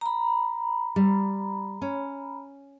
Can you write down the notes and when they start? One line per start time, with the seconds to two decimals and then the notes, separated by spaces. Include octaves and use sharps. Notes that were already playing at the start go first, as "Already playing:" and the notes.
0.01 A#5 B5
0.96 G3
1.82 C#4